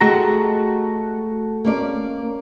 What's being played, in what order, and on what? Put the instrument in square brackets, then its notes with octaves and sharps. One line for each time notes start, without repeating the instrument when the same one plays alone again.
[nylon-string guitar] G#3 G4 [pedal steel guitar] A3 F#4 A#5
[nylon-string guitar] A#3 C#4 D5